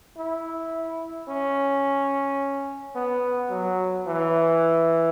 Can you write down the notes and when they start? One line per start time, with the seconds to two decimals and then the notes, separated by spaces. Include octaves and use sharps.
0.18 E4
1.28 C#4
2.95 B3
3.50 F#3
4.06 E3